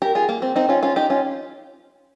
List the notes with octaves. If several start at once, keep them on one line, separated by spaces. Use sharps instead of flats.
G4 A#4
F4 G#4
A#3
C4
C4 D#4
C#4 F4
C#4 F4
D#4 G4
C#4 F4